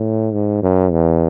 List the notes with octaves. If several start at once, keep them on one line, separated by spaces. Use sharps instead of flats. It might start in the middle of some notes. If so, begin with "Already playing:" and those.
Already playing: A2
G#2
F#2
E2